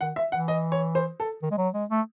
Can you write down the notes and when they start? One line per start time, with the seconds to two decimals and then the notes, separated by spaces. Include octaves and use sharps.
0.01 D#3 F#5
0.16 E5
0.32 E3 F#5
0.48 D#5
0.72 C#5
0.95 C5
1.20 A4
1.42 D#3
1.51 G#3
1.58 F#3
1.74 G#3
1.90 A3